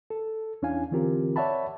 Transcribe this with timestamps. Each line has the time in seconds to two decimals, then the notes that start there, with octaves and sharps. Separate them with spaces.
0.10 A4
0.62 E2 C#4 D4 E4 F5 G#5
0.91 D3 E3 C4 F4 G4 A#4
1.36 C#5 D5 E5 F#5 A5 B5